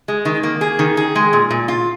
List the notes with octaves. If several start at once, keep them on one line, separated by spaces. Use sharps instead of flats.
G#3
D#3
A#3
G#4
D#3
G#4
G#3
A#2
A#2
F4